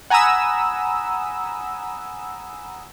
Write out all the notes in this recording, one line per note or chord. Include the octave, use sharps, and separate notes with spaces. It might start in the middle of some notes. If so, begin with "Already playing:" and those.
F#5 G#5 A#5 B5 D#6 E6